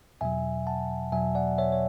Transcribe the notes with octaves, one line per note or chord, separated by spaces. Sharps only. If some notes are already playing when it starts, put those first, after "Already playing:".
E2 B2 F#3 E5 G#5
F#5 A5
E2 B2 F#3 E5 G#5
D5 F#5
C#5 E5
C#5